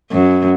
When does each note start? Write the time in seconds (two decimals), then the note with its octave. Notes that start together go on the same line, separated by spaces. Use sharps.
0.12 F#2